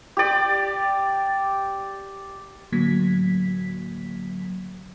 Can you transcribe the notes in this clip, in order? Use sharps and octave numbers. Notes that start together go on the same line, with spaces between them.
G4 D5
A2 D3 F#3 A#3 G#6 B6